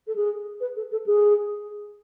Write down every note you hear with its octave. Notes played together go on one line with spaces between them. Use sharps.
A4
G#4
B4
A4
A4
G#4